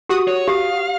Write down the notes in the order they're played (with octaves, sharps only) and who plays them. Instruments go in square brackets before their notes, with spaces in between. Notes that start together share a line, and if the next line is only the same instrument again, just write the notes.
[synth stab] F#4 D#6 [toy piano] G4
[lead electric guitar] C#5
[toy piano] G4 [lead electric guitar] F5